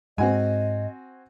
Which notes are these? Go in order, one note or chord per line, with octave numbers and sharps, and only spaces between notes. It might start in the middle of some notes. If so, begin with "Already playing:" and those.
G#2 G#3 C4 F#4 D#5 G#5